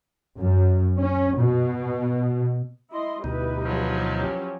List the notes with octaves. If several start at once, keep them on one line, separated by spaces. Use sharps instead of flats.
F#2
C#4
B2
E4 D#5 C6
D2 B2 G3 D#4 E4 B4
F3 F#3
C#4 G4